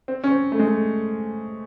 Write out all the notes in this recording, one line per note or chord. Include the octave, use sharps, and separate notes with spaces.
C4
C#4
C4
A3
G#3
A3